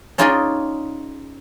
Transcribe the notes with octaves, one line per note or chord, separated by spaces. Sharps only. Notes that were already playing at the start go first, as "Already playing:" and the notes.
C#4 D#4 F4 G#4 D5 D#5